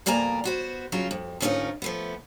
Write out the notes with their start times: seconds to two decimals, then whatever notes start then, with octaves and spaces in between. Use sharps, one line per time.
0.06 F2 B2 A#3 D5 G#5 A#5
0.44 B3 F#4 C5
0.92 C#3 F#3 F4
1.11 F2
1.40 D2 G#2 C#4 D#4 F4 A#4
1.82 F3 A3 B3